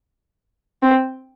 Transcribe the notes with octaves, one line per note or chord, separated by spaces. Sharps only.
C4